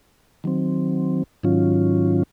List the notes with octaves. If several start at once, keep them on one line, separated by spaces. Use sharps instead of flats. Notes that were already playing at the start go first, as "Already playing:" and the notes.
D#3 F#3 C4
G#2 D#3 F#3 C#4 F4